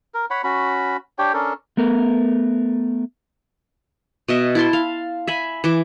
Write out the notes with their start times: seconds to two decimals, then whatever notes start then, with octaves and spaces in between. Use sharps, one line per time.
0.14 A#4
0.30 C#5 F#5 B5
0.44 C#4 F#4 B5
1.18 D4 G4 C#5 G5
1.34 C#4 D4 A4 A#4
1.77 A3 B3 A#4
4.28 B2 D#5 E5
4.55 E4 A5 C6
4.73 F5
5.27 E5 G#5 B5
5.64 E3 E5 D6